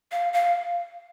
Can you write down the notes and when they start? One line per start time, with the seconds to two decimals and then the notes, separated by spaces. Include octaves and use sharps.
0.12 F5
0.33 F5